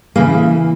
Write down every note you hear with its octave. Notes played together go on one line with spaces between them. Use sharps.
C#3 E3 A#3